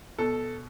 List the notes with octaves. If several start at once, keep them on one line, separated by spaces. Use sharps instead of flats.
B2 A4